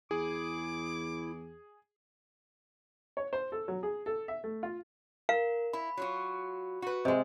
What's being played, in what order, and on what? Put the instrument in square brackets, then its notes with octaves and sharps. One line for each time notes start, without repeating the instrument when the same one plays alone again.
[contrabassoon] E2 [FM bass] E4 [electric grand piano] G#4 [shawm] D6
[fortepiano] C#5
C5
A4
F#3
G#4
A4
E5
A3
F4
[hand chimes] A#4 [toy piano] F5
[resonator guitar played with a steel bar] E4 [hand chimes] B5
[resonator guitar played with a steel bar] F#3 F4 F#4
F#4 B4
[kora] C3 G#3 [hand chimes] D#5